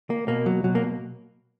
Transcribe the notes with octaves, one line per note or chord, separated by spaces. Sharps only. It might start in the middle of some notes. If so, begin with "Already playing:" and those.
A#3
B2 A#3
F#3
B2 F#3
A#3